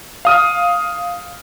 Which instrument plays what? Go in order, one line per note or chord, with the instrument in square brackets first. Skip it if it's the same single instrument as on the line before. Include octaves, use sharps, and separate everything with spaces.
[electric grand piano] F5 D#6 F6